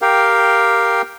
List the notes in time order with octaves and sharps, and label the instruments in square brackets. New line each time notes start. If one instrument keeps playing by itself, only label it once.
[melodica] G4 A#4 F5 G5